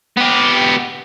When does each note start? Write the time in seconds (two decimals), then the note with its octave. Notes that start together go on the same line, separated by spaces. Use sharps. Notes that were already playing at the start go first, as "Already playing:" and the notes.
0.17 B3 G4